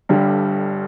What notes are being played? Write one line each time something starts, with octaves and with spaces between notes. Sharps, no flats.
G1 G2 D3 G3